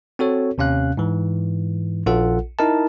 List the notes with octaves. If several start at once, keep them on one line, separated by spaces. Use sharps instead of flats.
C4 F#4 A4 C#5
D#2 C3 C#4 F5 F#6
G#2 E3
A#1 F4 A4 F#5
D#4 E4 A#4 D#5 A5